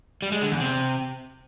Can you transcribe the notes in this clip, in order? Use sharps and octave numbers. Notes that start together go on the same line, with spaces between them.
G3
G#3
D3
E2
C3